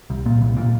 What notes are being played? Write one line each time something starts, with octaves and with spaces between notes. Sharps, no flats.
C2
A#2
C2
A#2